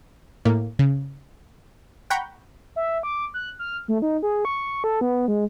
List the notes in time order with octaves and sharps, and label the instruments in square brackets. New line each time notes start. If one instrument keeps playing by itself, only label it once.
[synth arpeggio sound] A2 A#3
C#3
F#5 G5 A#5 B5 C#6 G6
[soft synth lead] E5
D6
F#6
F6
A3
D#4
G#4
C#6
A4
B3
G#3